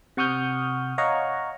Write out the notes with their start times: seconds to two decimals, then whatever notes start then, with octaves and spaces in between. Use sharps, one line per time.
0.17 C3 F#5 C#6 D#6 F6 G6
0.98 C#5 D#5 F5 F#5 A#5 C#6